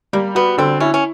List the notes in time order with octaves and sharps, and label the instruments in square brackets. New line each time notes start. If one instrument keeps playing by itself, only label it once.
[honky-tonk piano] G3 [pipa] A#3
[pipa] B3 [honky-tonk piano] F#4
[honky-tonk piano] D3 [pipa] C4
[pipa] C#4 [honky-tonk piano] E4
[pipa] C#4